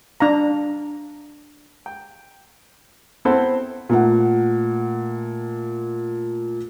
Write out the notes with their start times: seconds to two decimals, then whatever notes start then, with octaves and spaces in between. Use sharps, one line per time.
0.20 D4 F5 A#5
1.86 G5
3.25 B3 C4 E4 A4 C5 F#5
3.89 A#2 A3 F#5